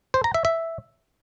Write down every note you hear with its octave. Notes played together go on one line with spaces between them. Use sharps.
C5
A#5
E5
E5